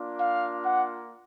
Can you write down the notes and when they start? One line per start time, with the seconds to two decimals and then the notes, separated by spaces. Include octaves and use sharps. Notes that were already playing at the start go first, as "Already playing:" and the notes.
Already playing: A#3 D4 F4
0.19 F5
0.62 F#5